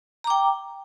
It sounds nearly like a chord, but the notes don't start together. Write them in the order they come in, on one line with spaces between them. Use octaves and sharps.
A#5 D6 G5